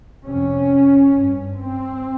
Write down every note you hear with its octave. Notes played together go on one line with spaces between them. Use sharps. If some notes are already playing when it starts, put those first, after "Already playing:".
F2 C3 C#4
G2
C4